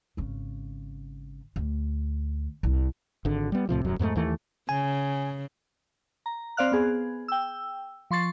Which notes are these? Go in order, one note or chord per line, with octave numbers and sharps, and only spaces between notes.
G#1 C#3
D2
C2
G#1 D3
G3 B3
C2 A2 C3 F3
D#1 F#2 F#3
F2 G#2 G#3 A3
D#2 E3 A3
C#3 G#5
A#5
C4 C5 D5 F5 F6 F#6
B3 G#4
G5 E6
F3 C6 C#6 A6 C7